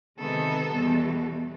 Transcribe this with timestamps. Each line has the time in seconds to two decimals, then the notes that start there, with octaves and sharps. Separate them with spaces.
0.19 C3 D#3 G#3 B3 A4
0.71 E2 B2 G3